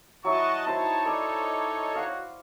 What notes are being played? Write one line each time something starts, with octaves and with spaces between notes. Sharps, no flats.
F#3 E4 F#4 D#5 E5 A5 C#6
D#4 E4 C5 C#5 A5
A4 D5
F#4 F5